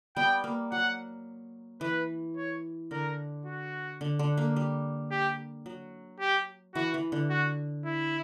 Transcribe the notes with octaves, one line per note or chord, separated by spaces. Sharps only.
G3 B3 G5
A#3
F#3 F#5
E3 B4
C#5
D3 A#4
F#4
D3
D3
A#3
G3
G4
F#3
G4
E3 F#4
E3
D3
F#4
E4